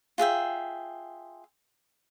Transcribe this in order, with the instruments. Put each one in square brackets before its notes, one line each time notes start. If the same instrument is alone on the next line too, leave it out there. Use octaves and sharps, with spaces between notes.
[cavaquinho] F4 G#4 E5 G5